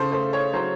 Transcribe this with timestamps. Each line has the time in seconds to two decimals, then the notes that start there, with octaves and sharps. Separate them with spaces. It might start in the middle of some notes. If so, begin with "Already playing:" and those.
Already playing: C#3 A4 C5
0.12 A3 C5
0.33 C#5
0.53 F#3 C5